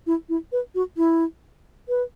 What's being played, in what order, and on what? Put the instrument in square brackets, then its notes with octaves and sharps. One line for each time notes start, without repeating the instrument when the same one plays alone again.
[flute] E4
E4
B4
F#4
E4
B4